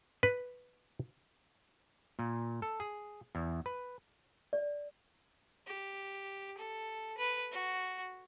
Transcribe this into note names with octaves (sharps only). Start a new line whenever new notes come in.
B4
A#2
A4
G#4
E2
B4
D5
G4
A4
B4
F#4